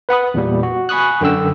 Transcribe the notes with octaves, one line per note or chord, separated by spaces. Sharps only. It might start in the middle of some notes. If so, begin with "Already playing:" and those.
B4 F#5 B5 D#6
E2 A#2 G3
F#4
G#5 B5 C#6 D#6 F#6
F#2 D3 G5 E6